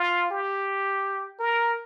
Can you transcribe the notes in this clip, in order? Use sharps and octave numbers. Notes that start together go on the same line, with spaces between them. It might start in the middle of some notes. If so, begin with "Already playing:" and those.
Already playing: F4
G4
A#4